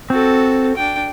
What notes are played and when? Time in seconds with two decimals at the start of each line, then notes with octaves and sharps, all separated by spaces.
0.10 C4 F#4 A4
0.77 D4 G5